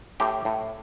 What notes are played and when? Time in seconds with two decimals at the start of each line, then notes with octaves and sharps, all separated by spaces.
0.20 A2 G4
0.45 A2